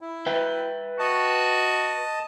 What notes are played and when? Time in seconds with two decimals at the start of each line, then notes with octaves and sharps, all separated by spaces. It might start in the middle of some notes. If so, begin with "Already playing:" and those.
0.01 E4
0.26 B4 E5 G5
0.99 F#4 D#5 A5